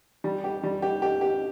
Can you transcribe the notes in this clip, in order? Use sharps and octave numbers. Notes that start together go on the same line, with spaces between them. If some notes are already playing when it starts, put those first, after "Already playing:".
G3
G4
G3
G4
G4
G4